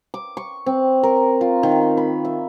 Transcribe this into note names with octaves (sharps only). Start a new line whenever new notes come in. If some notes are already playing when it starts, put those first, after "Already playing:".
D6
C#6
C4
A#4
F4
D#3
B5
E5